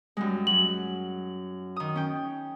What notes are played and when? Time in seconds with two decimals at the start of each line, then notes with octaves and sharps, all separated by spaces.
0.17 F#2 G3 G#3
0.47 F#3 F#7
1.76 D#3 D#6
1.95 C#4 G5